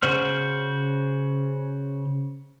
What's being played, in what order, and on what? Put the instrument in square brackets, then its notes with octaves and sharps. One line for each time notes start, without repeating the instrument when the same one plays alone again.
[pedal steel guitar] C#3 F#4 C5 F6